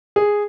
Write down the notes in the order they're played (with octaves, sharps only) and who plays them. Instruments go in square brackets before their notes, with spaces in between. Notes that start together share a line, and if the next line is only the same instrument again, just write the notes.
[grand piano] G#4